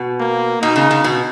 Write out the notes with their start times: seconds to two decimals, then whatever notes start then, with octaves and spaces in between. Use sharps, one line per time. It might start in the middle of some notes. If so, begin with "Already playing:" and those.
Already playing: B2
0.20 A#3
0.62 B2 D#4
0.76 C#3
0.91 C#3
1.04 B2